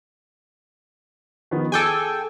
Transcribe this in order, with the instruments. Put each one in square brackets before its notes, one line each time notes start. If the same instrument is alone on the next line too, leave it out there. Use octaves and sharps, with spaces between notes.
[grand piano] D#3 F3 B3
[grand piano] G#4 D6 E6 [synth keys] A4 G5 G#5